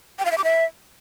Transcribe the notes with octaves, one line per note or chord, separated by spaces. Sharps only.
G5
F5
E5
D6
E5